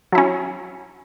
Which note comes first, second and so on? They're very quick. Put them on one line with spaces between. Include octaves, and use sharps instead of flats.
F#3 E4 C#4